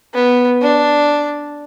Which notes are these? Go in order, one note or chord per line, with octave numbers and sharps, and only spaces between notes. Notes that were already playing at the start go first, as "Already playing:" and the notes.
B3
D4